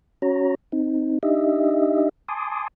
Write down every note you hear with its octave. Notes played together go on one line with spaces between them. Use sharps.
C#4 F#4 C#5 A#5
C4 D#4
D4 D#4 G4 D#5 E5
G#5 A5 C6 D6 D#6